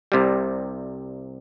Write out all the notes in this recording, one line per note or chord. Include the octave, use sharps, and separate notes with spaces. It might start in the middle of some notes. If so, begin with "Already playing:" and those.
C2 C3 G3